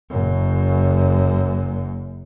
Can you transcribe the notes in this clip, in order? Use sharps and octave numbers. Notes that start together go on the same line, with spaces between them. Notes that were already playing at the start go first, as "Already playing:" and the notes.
F#1 F#2